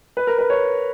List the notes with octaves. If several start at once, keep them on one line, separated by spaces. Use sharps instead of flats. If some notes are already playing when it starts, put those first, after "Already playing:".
B4
A#4
B4
C#5